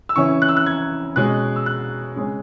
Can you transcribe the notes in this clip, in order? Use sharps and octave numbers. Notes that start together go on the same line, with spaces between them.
E6
C#3 E3 C#4 C#6
F#6
E6
F#6
G#6
B2 G#3 C#4 F#6
E6
F#6
C#3 G#3 C#4